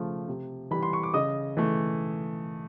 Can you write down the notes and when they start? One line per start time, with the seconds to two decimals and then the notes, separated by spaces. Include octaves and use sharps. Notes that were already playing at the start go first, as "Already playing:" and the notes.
Already playing: C#3 F3 A3
0.28 C3
0.71 E3 G3 B5
0.83 C6
0.93 C#6
1.03 D6
1.14 C#3 D#5 D#6
1.57 E3 A3